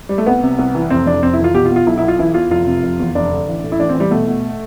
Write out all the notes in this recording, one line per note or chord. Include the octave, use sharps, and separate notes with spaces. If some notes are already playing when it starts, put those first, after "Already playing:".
G3
A3
C2 B3
C3
C2
E3
F1 C4
F2 D4
F1 C4
E4
E3 F4
B2 G4
F4
B2
F4
B1 E4
E4
B1
F4
E3 E4
E2 F4
F1 F4
C3
F1
E2
F1 D4
D3
A1
A2
E4
A1 D4
C4
E3
G3
B2 A3
B2